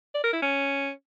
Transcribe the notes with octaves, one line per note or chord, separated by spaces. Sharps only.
D5
A#4
E4
C#4